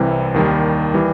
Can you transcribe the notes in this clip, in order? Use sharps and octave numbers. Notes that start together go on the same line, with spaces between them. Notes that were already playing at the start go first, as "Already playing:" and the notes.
Already playing: C2 C3 E3 G3
D#2 D#3 G3
E3 G3